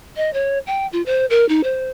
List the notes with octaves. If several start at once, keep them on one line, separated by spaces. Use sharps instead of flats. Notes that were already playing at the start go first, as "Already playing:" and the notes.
D#5
C#5
G5
F4
C5
A#4
D#4
C5